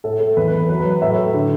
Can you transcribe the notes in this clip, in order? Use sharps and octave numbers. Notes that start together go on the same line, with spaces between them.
A2 A4
A3
E2 B4
B4
E2
F#3 B4
B4
F#3
B4
A2 E5
A3
D3